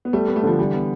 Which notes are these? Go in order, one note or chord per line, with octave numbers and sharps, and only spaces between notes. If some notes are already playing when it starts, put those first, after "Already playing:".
B3
G3 A3
B3
A3
D3 F3
E3 G3
B3